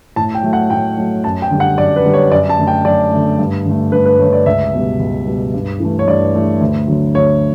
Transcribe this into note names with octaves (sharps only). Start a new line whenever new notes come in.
A2 A5
G5
F#3 A3
F#5
A2 G5
F#3 A3
F#2 A5
G5
D3 G3
F#5
F#2 D5
B4
D3 G3
C#5
F#2 D5
A5
D3 A3
G5
F#2 D5
D3 A3
G2
D3 A3
G2 B4
B4
D3 A3 C#5
D5
C#2 E5
B2 G3
C#2
B2 G3
G2
E3 A3
C#5
G2 D5
E3 A3
D2
D3 F#3
D2 C#5